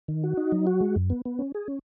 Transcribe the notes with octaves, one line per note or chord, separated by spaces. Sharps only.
D#3
F#4
D#4
F#3
F#4
G#3
F#2
B3
B3
C#4
G#4
C#4